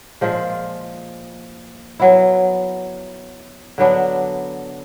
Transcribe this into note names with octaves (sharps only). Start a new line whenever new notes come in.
A#2 F3 G#3
F#3 B3 E4
D3 F#3 B3 D4